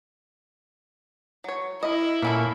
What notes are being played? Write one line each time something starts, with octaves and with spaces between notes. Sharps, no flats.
F#3 C#5
E4 A#4 D#5
A#2 A#3 C#4 A4